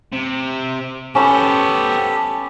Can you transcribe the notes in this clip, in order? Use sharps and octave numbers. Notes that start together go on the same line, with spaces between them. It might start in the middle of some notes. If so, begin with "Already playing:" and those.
C3
B3 C#4 G4 A4 C5 B5